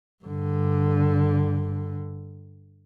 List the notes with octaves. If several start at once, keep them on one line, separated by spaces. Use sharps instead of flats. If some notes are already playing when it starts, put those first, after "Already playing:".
G2 D3